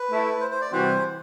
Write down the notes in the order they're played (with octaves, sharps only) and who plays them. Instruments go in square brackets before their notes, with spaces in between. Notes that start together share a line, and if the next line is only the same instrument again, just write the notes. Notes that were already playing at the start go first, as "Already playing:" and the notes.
Already playing: [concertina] B4
[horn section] A3 E4 A4
[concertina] C5
C5
D5
[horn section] C3 E3 G3 C4 F#4 [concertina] C5